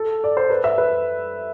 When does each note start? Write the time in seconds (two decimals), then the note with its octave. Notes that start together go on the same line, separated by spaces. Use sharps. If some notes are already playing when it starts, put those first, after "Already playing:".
Already playing: A4
0.24 D5
0.37 C5
0.50 B4
0.64 E5
0.78 B4